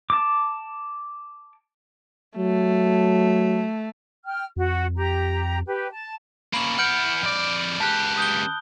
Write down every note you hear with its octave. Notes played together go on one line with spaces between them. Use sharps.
A5 D6
F#3 A3
G5 F6
F2 F#4
G4 A#5
G4 B4
A5
A#3 C#4 B5 F#7
E3 F#5 F6 G6 D7
F2 D5
C#2 G4 A5 F#6
D#6 G6 G7